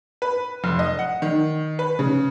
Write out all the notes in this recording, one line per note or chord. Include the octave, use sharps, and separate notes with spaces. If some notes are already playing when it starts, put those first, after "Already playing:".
B4
F1
D#5
F#5
D#3
B4
C#3